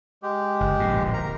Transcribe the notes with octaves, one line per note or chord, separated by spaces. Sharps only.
G#3 G4
F#1
D1 A#1 G#2
A#4 A#5